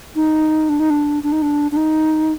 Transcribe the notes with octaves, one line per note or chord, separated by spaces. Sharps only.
D#4
D4
D#4
D4
D4
D#4
D4
D4
D#4